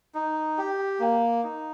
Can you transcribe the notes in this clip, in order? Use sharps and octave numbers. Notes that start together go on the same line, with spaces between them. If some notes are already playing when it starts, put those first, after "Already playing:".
D#4
G4
A#3
D#4